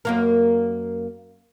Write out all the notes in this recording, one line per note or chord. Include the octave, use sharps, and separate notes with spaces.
F#2 A#3 A#4